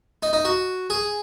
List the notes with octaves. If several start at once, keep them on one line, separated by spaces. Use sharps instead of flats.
D#4
D#4
F#4
G#4